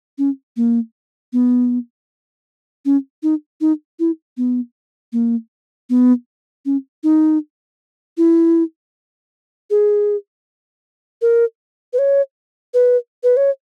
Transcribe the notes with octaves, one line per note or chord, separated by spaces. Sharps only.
C#4
A#3
B3
C#4
D#4
D#4
E4
B3
A#3
B3
C#4
D#4
E4
G#4
A#4
B4
C#5
B4
B4
C#5